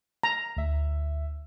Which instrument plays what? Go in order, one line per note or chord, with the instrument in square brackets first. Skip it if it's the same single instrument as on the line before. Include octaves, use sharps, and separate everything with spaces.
[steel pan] A#5
[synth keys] D2 E5